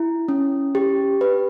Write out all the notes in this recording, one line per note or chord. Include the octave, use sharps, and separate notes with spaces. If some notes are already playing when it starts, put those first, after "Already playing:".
Already playing: E4
C#4
G4
B4